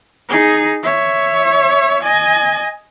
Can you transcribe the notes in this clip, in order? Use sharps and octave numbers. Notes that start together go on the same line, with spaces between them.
D#4 G#4
C#5 E5
D#5 G#5